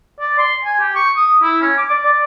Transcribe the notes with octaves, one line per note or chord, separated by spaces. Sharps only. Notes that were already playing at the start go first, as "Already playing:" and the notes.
D5
C6
G#5
G4
C#6
D#6
E4
C#4
D6
D5
D5